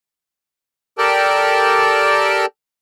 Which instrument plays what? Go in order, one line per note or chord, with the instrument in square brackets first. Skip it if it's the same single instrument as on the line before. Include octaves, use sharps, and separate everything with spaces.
[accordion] G4 A4 A#4 D5 G5 A5